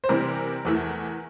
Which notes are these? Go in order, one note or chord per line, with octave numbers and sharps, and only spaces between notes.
C5
C3 E3 G3 C4 A#4
E2 E3 A3